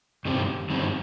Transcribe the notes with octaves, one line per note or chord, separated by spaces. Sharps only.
G2 D#3 G3 C4
G2 D#3 G3 C4